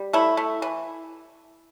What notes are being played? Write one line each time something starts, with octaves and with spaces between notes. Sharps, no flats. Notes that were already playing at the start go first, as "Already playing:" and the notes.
Already playing: G3
A3 E4
A3
E3